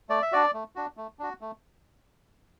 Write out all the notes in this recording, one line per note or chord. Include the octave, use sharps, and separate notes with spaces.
A3 D5
E5
D4 F#4 D5
A3
D4 F#4
A3
D4 F#4
A3